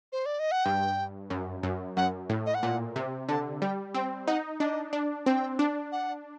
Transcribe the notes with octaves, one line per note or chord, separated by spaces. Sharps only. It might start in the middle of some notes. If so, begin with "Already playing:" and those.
C5
D5
D#5
F#5
G2 G5
F#2
F#2
F#2 F#5
A2
D#5
F#5
A#2
C3
D3 A5
G3 G5
C4 G5
D#4 F#5
D4 D#5
D4
C4 G5
D4
F#5